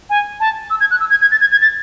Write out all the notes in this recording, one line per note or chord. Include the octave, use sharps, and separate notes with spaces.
G#5
A5
E6
G#6
F#6
E6
G#6
G#6
A6
G#6
G#6
A6